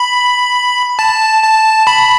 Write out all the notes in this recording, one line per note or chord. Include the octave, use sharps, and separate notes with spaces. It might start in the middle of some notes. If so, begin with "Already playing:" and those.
Already playing: B5
A5
A5
B5